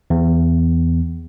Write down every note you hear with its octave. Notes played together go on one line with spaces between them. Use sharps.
E2